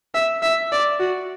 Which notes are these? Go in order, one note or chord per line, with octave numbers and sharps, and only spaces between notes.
E5
E5
D5
F#4